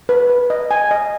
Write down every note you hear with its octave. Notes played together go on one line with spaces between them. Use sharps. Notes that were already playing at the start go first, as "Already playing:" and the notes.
B4
B4
D#5
G#5
D#5